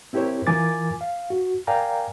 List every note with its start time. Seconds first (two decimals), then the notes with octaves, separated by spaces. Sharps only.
0.13 C4 E4 G4 A#4 C5 C#5
0.47 E3 F4 A#4 G#5 D6 A6
1.01 F5
1.30 F#4
1.67 A#4 D5 F5 G5 G#5 A#5